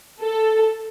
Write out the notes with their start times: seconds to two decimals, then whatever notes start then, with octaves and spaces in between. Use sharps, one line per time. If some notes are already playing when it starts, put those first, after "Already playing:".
0.21 A4